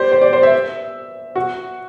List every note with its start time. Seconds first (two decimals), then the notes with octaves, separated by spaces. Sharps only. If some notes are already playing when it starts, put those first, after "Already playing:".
Already playing: G4 C5 D5
0.12 C5
0.21 D5
0.33 C5
0.43 E5
1.35 F#4